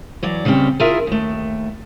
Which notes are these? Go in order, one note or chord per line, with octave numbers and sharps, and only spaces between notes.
E3 F#3 D5
C#3 G3 C4 C#4 G4
E4 F4 G#4 A#4 E5
D#2 A3